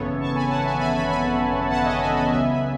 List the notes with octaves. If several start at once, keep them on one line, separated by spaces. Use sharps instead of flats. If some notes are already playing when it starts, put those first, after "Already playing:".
Already playing: G#1 F#2 C#3 E3 B3 A4 C#5
A5 C#6
G#5 B5
F#5 A5
E5 G#5
G#5 B5
G#5 B5
G#5 B5
F#5 A5
D#5 F#5
G#5 B5
G#5 B5
C#2 C#3 F#3 B3 E5 G#5
G#5 B5